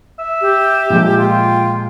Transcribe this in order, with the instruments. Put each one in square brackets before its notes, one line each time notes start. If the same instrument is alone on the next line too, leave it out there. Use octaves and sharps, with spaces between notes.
[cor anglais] E5
[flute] G4
[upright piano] A#2 F3 G#3
[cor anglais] F4 [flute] G5